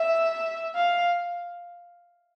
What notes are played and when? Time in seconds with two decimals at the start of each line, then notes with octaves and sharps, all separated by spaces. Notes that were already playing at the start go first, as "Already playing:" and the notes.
Already playing: E5
0.75 F5